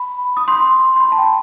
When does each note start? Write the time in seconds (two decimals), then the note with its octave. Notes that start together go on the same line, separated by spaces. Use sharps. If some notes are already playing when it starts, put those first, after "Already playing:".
Already playing: B5
0.37 D#6
0.48 C6
0.96 C6
1.00 B5
1.12 A5
1.18 G5